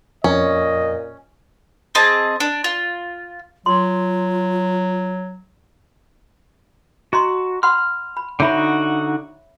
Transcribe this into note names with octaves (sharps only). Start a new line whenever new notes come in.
F2 A#2 C#4 D#5
C4 G#4 D#5 A5
D4
F4
F#3 F4 C6
F#4 D#5 A#5 C6
F#5 B5 C6 F6
B5
D3 D#4 F#4 C#5 E5 B5